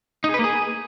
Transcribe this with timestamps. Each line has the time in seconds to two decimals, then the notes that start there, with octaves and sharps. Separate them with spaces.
0.24 D#4
0.29 G#4
0.34 B4
0.39 A#3
0.44 G#4